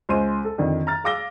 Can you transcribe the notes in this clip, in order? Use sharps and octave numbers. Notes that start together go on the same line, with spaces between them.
C#2 C5 G#5 C6 D#7
A4
F2 D3 D#3
A#5 F6 A6
G#4 F5 D6 E6 A#6 G7